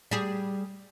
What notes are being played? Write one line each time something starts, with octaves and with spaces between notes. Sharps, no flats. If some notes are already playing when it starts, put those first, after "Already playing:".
G3 G#4